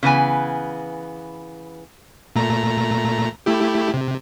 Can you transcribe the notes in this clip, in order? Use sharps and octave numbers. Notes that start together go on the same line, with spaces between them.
C#3 E3 B3 G#5
A#2 A3 A#5
A3 E4 G4
C3